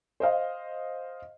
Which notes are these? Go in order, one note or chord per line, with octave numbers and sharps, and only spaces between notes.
C5 D#5 F5